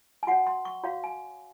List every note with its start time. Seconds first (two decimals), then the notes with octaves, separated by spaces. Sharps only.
0.23 G#5
0.27 F#4 C#5 F#5
0.47 C6
0.65 C#6
0.84 F#4 C#5 F5
1.04 G#5